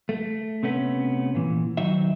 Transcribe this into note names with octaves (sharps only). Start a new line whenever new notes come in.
A3
C3 A3 B3 C#4
A#2 E3
D#3 F#3 D#4 E5